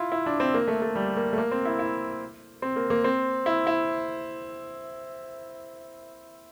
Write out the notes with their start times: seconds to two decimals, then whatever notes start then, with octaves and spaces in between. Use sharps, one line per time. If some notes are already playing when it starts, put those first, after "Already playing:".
Already playing: E4 F4
0.12 E4
0.26 D4
0.40 C4
0.54 A#3
0.68 A3
0.82 A3
0.95 G3
1.16 A#3
1.33 A3
1.38 A#3
1.52 C4
1.65 E4
1.79 E4
2.62 C4
2.76 A#3
2.90 A#3
3.04 C4
3.46 E4
3.67 E4